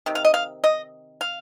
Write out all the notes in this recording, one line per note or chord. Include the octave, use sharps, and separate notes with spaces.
C3 D#3
F5
D#5
F5
D#5
F5